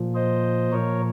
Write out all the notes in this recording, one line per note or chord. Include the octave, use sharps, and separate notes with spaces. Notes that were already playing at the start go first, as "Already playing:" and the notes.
Already playing: A#2 F3
C5 D#5
A#2 F3 A#4 C#5